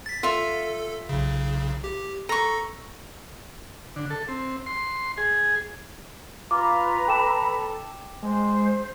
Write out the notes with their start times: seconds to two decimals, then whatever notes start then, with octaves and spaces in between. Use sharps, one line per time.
0.06 A6 B6
0.23 F4 A4 E5
1.09 B1 C#3
1.84 G4
2.29 A4 A#5 C#6
3.96 D3
4.10 A4
4.28 C4
4.66 C6
5.18 G#4
6.51 F4 B4 A#5 D6
7.08 A4 G5 D6 E7
8.22 G#3 C5